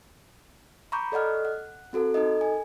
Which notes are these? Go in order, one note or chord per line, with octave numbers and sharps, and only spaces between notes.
A#5 B5 C#6 D6 G6
A4 D5 D#5 F#5 F6
F#5
C4 F#4 A4 A#4
D#4 A4 A#4 D#5
G#5